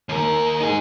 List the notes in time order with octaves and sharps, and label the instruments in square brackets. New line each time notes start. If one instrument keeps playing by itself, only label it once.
[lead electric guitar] D#2 A#4
D#4 G#4